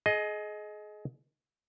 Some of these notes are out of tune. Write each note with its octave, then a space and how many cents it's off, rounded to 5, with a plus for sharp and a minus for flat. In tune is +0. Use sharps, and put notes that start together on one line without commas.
G#4 +30 D#5 +5